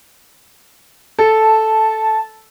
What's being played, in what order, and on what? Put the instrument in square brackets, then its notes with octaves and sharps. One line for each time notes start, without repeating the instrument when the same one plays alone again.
[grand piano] A4 [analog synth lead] A5